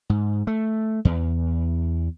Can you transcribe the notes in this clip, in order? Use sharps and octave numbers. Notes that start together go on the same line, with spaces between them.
G#2
A3
E2